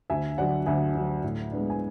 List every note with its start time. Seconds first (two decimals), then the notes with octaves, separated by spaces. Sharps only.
0.10 D2 E5 G#5
0.38 D3 F#3 D5 F#5
0.66 D2 E5 G#5
0.95 D3 F#3
1.24 A2
1.52 G#3 B3 D4
1.70 G#5